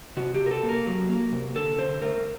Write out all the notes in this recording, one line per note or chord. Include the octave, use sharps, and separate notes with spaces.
C3 F#4
G4
C3
A#4
A4
A#3
A#4
F#3
A#3
C3
D3 A4
D3 C5
A3 A#4